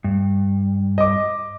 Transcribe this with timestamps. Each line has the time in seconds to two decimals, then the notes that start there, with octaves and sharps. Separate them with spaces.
0.04 G2
0.98 D#5 D6